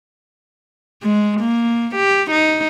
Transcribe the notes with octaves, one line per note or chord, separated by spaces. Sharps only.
G#3
A#3
G4
D#4